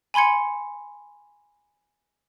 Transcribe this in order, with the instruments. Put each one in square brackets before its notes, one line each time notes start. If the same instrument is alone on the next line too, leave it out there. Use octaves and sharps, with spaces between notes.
[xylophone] G#5 B5 C6 G#6 C#7